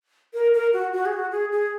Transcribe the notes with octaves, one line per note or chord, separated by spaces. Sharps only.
A#4
A#4
F#4
F#4
G#4
F#4
G#4
G#4